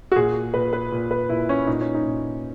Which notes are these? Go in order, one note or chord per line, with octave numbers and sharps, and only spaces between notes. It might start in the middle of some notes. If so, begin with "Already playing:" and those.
F#4
A#2 G#4
A#2 B4
B4
A#2
B4
A#2 E4
C#4
A#2 D#4
C#4
D#4
A#2